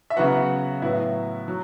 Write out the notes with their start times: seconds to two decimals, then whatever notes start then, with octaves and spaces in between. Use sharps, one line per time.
0.10 E5
0.16 C#3 F#3 B3 F#4 F#5
0.82 A2 F#3 B3 E4 E5
1.48 F#3